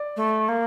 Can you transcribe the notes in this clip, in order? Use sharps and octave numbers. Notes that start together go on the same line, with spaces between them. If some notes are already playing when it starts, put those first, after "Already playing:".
Already playing: D5
A3
A#3